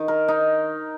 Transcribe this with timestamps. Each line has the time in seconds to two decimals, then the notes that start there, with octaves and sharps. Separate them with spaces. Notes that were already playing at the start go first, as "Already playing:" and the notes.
Already playing: D#3
0.08 A#4
0.28 D#4